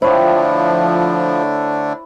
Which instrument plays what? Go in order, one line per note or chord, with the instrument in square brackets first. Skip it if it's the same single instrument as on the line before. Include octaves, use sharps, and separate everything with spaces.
[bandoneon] D3 A3 D4 [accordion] F3 [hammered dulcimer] E4 C#5 G5 [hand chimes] C5